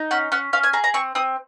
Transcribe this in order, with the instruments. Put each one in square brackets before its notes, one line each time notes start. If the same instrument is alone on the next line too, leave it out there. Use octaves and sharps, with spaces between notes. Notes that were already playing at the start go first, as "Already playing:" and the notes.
Already playing: [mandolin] D#4
C#4 F#5
C#4 F#5
C#4 F5
G#5
G#4 A#5
A#5
C4 C#6
C4 D#6